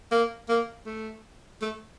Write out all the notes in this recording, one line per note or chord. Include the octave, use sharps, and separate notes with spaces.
A#3
A#3
A3
A3